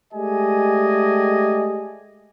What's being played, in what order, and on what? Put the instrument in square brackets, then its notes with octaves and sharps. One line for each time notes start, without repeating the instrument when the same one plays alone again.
[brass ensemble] G#3 A3 G4 D5 D#5 G#5